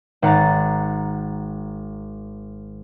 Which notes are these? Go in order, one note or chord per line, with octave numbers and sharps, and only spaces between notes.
G#1 F#5 A#5 A6